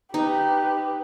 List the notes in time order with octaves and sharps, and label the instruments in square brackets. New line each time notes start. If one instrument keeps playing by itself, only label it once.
[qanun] D#4 [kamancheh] G4 B4